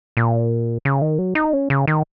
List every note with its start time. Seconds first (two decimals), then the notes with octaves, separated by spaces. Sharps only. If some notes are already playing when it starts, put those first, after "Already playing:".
0.17 A#2
0.85 C#3
1.02 D#3
1.19 F#3
1.35 D#4
1.53 C#4
1.70 C#3
1.87 D#3